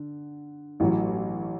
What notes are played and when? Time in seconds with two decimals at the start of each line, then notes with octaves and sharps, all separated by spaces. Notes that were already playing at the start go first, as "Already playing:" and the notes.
Already playing: D3
0.80 A1 A2 F#3